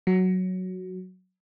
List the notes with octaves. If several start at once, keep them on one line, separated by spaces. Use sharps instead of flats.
F#3